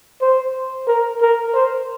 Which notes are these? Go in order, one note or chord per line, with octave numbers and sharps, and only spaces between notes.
C5
A#4
A#4
C5